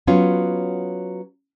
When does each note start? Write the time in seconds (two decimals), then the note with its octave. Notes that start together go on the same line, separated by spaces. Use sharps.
0.07 F#3 B3 C#4 F4